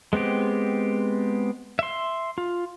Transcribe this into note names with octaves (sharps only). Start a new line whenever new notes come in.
G#3 B3 C4 G4
E5 C6
F4